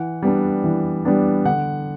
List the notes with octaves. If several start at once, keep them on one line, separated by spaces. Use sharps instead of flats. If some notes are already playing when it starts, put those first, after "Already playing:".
Already playing: E3 F#5
G3 B3 D4
E3
G3 B3 D4
D3 F#5